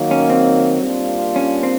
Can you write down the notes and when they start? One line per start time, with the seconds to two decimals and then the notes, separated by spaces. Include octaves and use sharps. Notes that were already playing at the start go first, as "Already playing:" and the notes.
Already playing: D#3 F#3 A#3
0.11 C#4
0.30 C4
0.83 G3 A#3 D4 F4
1.36 C#4
1.63 C4